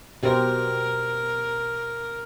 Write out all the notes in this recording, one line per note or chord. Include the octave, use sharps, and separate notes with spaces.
B2 G4 A#4 C5